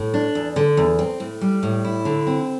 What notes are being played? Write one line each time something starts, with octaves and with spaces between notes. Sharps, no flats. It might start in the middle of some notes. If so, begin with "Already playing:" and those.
Already playing: A2
D4
E2
D3
E2
C4
A2
G3
A2
E4
D3
C4